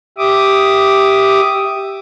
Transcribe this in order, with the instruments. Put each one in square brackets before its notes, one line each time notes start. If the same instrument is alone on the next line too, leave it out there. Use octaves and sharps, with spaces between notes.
[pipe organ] G4 E5 D6 D#6